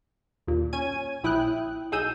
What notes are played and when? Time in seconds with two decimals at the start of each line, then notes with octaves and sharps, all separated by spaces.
0.47 D#2 A#2
0.73 C#4 G#5 G#6 D#7
1.23 A#1 E4 G5 D#6 F#6
1.92 B1 D#4 G#4 E6 G6 D#7